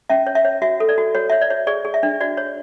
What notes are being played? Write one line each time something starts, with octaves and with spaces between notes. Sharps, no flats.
C#4 E5
C#5
E5
C#5
F#4 E5
A4
D5
F#4
F#4 C#5
C#5 E5
D5
C#5
G#4 D5
G#4
E5
D4
F#4 D5
C#5